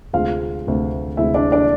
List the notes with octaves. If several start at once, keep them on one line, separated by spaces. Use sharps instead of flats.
D2 C3 G#3 F4 F5
D2 C3 G#3
D2 C3 G#3 E4 E5
D4 D5
D4 D5